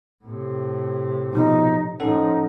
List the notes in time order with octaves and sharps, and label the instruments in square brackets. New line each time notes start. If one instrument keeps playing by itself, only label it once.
[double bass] A2 C3
[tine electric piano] B2 F3 B3 [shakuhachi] D#4
[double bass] A2 F3 [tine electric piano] C#4 A4 F#5 [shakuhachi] D#4